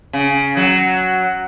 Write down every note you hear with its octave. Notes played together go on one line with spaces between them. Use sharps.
C#3
F#3